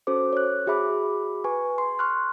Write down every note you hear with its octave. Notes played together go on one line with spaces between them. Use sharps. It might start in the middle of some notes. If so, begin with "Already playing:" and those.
C#4 F#4 A4 C5 D6
C#5 F#6
F#4 G#4 E5 B5 D6
B4 G#5 C#6
C6
C6 C#6 F6 F#6